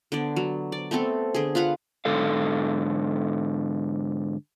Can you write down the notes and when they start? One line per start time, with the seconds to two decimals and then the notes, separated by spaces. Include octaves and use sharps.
0.12 D3 B3 D5
0.36 F#3
0.72 D5
0.91 A3 B3 C4 A4
1.34 D3 G#4
1.55 F4 B4 F5 F#5
2.05 G#2 D3 A4 F5